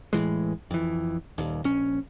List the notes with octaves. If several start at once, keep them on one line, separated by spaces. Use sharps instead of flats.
A2 C3 E3 G#3
F2 E3
D#1 D#2
A#1 C#4